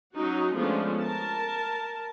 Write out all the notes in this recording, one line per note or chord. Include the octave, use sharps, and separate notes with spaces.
F#3 C#4 D#4 F#4
F3 G#3 A3 B3 C#4 D4
A#4 A5